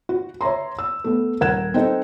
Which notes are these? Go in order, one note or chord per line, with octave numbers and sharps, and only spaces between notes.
F#4
C#5 E5 A#5 C6
E6
A3 B3
D#1 A#4 F#5 F#6 G#6 E7
C4 D#4 A4